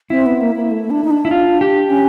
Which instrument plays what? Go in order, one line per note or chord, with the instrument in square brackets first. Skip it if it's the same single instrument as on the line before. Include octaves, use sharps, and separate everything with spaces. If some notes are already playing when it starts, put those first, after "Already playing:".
[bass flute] C4 [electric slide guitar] E4
[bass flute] B3
A#3
A#3
A3
D4
D#4
D4
[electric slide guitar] E4
F4
G4
[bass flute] C#4